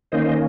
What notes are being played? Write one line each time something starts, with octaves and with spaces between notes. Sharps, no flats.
D#3 A#3 C#4 C5 D#5